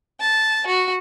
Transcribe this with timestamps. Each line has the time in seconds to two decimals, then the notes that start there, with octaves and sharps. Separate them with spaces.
0.20 A5
0.67 F#4